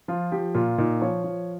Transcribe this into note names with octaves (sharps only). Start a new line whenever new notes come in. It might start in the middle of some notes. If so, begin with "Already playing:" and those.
F3 F4
F3 G4
A#2 F4
A#2 D#4
F3 C#5
F3